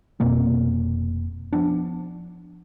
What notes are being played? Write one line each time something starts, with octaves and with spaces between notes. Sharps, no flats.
F1 B2 A#3 C4
F3 B3 D4